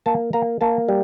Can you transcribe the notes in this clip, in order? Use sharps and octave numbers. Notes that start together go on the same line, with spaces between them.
A#3 A5
A#3 A#5
A#3 A5
G3